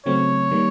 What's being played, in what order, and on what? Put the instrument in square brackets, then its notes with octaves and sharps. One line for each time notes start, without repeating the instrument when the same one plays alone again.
[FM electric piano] C#3 F#3 A3 C4 [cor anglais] C#5
[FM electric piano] D#3 G3 A#3